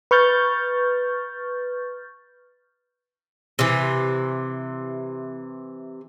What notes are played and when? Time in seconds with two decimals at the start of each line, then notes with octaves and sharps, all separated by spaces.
0.11 B4 C#6 F6 G6 A6
3.59 C3 E3